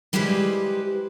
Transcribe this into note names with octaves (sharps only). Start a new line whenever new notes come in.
G3 G#3 E4 G4 B4 C5